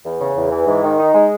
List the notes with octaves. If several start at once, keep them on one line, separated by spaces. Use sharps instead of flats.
E2
C#3
E2
E3
G#2
D#3
D#4
G#3